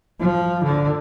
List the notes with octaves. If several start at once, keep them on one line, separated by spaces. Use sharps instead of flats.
F3
D3